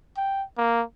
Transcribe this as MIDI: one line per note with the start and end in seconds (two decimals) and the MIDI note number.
0.17 0.43 79
0.57 0.82 58